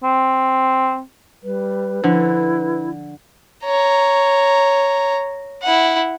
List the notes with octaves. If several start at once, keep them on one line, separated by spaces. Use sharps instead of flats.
C4
G3 B4
D3 F3 E4
C#5 A#5
E4 F#5